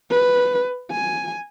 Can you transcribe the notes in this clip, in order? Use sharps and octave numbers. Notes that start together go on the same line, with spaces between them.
B4
G#5